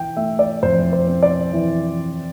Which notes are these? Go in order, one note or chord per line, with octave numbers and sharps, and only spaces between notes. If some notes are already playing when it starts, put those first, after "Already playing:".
Already playing: E3 G5
A3 E5
D5
F2 C5
C5
C4
D5
E3